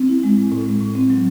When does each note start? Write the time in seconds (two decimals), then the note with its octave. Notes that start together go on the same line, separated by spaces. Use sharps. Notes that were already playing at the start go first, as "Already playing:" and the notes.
Already playing: C4
0.09 E4
0.23 G#3
0.37 A2
0.52 A2
0.66 G#3
0.81 A2
0.95 C4
1.10 F#3